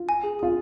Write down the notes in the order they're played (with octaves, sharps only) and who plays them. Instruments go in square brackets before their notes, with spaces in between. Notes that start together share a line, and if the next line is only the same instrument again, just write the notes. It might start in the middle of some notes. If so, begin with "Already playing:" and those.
Already playing: [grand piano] F4
[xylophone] G#5
G#4
[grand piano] F4 [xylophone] G#4